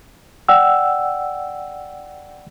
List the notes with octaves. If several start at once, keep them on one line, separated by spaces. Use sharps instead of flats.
D5 F#5 G5 E6